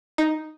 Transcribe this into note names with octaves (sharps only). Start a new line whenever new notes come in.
D#4